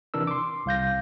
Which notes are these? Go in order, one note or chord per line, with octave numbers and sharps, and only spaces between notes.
C3 E3 D4 A#4 E6
C6 D6
C2 F5 G6 A#6